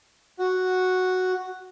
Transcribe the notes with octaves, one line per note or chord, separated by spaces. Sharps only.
F#4